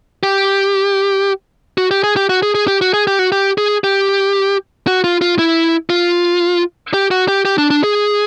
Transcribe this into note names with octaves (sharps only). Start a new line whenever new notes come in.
G4
F#4
G4
G#4
G4
F#4
G#4
G#4
G4
F#4
G#4
G4
F#4
G4
G#4
G4
F#4
F4
F4
E4
F4
G4
F#4
G4
G4
D4
D4
G#4